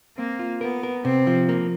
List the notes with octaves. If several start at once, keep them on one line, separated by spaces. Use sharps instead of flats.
A#3 C4
F4
B3 A#4
A#4
C3 C4
F3
A#3